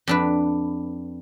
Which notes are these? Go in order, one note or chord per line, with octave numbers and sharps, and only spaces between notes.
F2 D4 B4